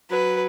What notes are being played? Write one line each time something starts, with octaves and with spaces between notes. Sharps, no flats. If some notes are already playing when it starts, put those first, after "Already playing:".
F#3 B4